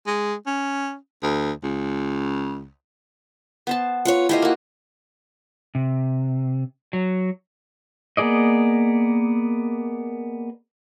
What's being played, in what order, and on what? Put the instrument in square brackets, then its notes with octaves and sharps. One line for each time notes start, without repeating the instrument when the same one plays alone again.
[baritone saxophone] G#3
C#4
D2
C#2
[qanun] B3 C5 A5
[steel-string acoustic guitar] F4 B4 C#5
[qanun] A3 G4 C5 [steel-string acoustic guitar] E4 F4 D#5
[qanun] A#3 F#4
[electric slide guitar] C3
F#3
[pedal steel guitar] A#3 B3 G#4 D5 D#5